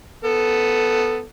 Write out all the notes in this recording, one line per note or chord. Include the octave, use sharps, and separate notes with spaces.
B3 A4